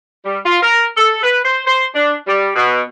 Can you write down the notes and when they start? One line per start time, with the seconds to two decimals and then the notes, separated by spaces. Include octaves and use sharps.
0.24 G3
0.45 F4
0.61 A#4
0.97 A4
1.23 B4
1.44 C5
1.66 C5
1.95 D4
2.27 G3
2.55 B2